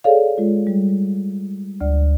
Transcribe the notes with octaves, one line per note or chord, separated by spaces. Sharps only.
G#4 A4 C#5 D5 F5
G#3 F4
G3
D2 D5